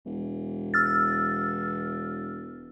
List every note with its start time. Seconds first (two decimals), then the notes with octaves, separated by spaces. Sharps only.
0.05 E1
0.74 E6 F6 A6